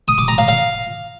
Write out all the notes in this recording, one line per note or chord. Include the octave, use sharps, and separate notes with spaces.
D#6
D6
A#5
F5
F5